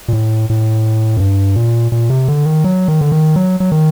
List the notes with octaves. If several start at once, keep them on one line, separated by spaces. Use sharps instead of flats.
A#2
A2
A2
F#2
G2
A#2
A#2
C3
D3
D#3
F#3
D#3
D3
D#3
F#3
F#3
D#3